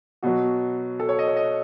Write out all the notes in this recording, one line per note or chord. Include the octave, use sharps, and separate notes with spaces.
B2 F#3 F#4
A4
C#5
D#5
C#5
D#5